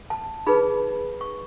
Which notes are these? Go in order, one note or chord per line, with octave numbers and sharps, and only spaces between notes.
A5
D#4 G#4 B4 B5
C#6